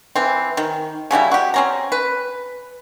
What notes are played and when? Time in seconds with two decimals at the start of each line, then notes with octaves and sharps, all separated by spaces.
0.16 E3 C4
0.57 D#3
1.11 C#3 F#3 G3 E4
1.31 F#4 G4
1.54 C4 C#4 A#5
1.92 B4